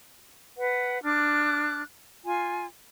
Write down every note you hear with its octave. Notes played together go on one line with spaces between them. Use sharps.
B4 F#5
D4 D6 F6 F#6
F4 G#5